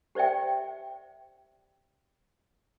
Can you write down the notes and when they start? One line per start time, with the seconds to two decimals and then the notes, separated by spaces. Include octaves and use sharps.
0.15 G4 C5 D5 E5 G5